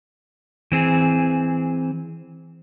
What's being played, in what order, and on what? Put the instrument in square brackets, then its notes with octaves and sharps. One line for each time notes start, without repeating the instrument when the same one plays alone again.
[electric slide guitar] E3 C4 G#4